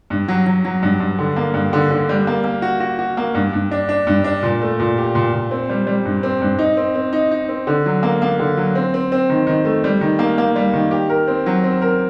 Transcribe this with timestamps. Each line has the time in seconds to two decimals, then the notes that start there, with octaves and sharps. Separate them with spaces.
0.10 G2
0.28 F#3
0.47 F#3
0.65 F#3
0.83 G2
1.00 G2
1.19 D3
1.36 A#3
1.54 G2
1.73 D3
1.91 D3
2.09 G3
2.27 A#3
2.44 A#3
2.62 F#4
2.80 F#4
2.99 F#4
3.17 A#3
3.35 G2
3.53 G2
3.71 D4
3.89 D4
4.07 G2
4.24 D4
4.43 A#2
4.61 A3
4.80 A#2
4.97 G4
5.15 A#2
5.33 A#2
5.51 C4
5.70 G3
5.87 G3
6.05 G2
6.23 C4
6.42 G2
6.59 D#4
6.77 C4
6.95 C4
7.13 D#4
7.31 D#4
7.49 C4
7.67 D3
7.86 F#3
8.03 A#3
8.22 A#3
8.40 D3
8.57 F#3
8.75 C4
8.94 C4
9.12 C4
9.29 D#3
9.47 D#3
9.65 A3
9.84 G3
10.01 D#3
10.19 A#3
10.38 A#3
10.56 G3
10.73 D#3
10.91 G4
11.10 A#4
11.28 C4
11.46 F#3
11.64 C4
11.82 A#4